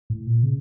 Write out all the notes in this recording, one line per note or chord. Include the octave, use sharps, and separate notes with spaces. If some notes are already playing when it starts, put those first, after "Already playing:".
A2
A#2
C#3